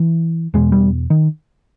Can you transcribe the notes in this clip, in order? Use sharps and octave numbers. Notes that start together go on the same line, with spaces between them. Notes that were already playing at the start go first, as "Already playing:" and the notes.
Already playing: E3
E2 B2 G#3
G3
D#3